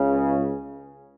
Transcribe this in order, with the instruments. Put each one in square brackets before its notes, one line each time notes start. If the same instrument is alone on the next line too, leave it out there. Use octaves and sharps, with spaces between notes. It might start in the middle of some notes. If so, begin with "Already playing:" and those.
Already playing: [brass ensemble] C#2 C#3